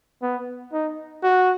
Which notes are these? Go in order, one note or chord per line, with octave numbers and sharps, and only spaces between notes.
B3
D#4
F#4